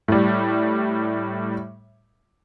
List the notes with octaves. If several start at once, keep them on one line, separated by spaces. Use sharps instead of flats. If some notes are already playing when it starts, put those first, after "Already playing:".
A2 G3